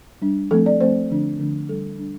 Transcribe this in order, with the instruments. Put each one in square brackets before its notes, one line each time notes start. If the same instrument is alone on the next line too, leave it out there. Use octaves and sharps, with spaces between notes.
[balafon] G3 D4
F3 A3 C4 A4
D5
F3 A3 C4 C5
D3 F3 A3 D4
D3 F3 A3 D4
G3 D4 A4
G3 D4